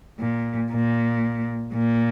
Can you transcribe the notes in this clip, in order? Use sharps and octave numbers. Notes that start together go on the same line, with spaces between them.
A#2
A#2
A#2